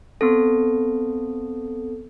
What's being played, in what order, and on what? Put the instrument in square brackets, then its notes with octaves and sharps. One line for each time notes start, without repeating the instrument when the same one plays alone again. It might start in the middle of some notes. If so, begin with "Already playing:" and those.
[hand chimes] B3 C4 A4